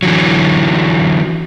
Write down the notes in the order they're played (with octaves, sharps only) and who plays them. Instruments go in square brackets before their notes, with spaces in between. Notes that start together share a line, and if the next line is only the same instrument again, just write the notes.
[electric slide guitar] D3 E3 F#3